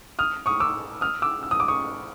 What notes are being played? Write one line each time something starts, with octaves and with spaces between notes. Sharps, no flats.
D#6 F6
C#6 D#6
D6 E6
D#6 F6
D6 E6
E6
D#6
D6
C#6 D#6